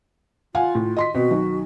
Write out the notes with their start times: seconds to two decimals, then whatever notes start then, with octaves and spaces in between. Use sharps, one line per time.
0.55 F4 F5 F#5 G#5
0.75 A2
0.96 D#5 C6 B6
1.14 B2 C4 F#4
1.31 B1 D#3